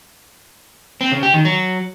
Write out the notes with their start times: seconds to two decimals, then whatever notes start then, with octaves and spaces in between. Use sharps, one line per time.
1.01 C4
1.12 C#3
1.23 G4
1.34 D#3
1.45 F#3